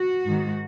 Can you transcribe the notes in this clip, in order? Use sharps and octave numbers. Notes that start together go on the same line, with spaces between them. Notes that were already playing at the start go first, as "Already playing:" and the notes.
Already playing: F#4
G#2 D#3